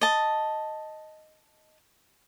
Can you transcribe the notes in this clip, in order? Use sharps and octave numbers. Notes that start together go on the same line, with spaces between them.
D#5 A5